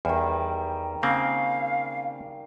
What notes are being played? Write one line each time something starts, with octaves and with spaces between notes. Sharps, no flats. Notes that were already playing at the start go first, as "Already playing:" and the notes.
E2 D#3 G3
C#3 A#3 C4 F5